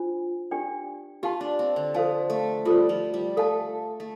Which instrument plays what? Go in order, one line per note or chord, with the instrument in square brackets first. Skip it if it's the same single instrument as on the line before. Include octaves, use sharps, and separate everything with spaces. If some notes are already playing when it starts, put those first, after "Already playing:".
Already playing: [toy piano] D4 F4 C5
D4 G4 D5 G5
[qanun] F4 [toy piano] G4 F5 A5 C6
[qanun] D4
C4
D3
[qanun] F3 [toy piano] A4 C5 F5 A5
[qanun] A3
[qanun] G3 [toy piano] F4 A4 C5
[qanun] F3
G3
[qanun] A3 [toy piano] A4 F5 A5
[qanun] A3